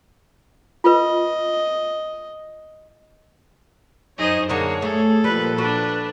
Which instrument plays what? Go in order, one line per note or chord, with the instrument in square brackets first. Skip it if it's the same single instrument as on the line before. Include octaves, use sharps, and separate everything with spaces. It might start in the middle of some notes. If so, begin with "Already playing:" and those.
[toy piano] F4 B4 [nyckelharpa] D#5
[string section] F#2 D#4 C#5 [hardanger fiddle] G#4 C5 [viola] D#5
[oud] F#2 D3 D#4 [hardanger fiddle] A#3 [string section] G#4 [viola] C#5
[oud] A3 [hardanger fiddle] A4
[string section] A#2 F3 [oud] G3 [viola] B4
[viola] D4 B4 [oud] F#4